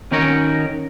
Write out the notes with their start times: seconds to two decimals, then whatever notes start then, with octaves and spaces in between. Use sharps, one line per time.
0.11 D#3 C#4 D#4 F#4 A#4 C#5